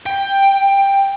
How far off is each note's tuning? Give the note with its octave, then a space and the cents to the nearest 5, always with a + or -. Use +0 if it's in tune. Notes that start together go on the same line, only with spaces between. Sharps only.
G5 +10